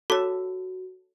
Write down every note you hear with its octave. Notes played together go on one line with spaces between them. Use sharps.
F#4 A4 C#5 D6